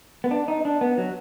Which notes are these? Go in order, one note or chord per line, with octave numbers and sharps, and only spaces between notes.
B3
D4
D#4
D4
B3
F#3